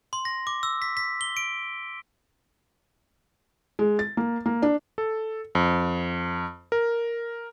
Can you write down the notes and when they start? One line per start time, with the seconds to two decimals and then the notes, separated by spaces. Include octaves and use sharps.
0.13 C6
0.25 A#6
0.47 D6
0.63 E6
0.82 B6
0.97 B6
1.21 G7
1.37 D7
3.79 G#3
3.99 A6
4.17 A#3
4.46 A#3
4.62 D4
4.98 A4
5.55 F2
6.72 A#4